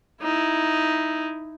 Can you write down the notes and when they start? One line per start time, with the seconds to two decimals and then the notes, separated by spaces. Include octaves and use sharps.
0.22 D#4 E4